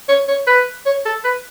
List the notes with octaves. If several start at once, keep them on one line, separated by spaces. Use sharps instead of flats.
C#5
C#5
B4
C#5
A4
B4